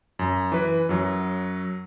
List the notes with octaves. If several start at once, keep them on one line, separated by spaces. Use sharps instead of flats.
F#2
E3 B4
F#2 F#3